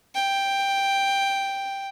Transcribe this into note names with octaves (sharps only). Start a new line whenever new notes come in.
G5